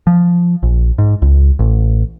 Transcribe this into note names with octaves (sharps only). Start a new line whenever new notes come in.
F3
A#1
G#2
C#2
A1